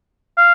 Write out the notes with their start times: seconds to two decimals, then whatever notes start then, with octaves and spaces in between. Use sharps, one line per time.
0.37 F5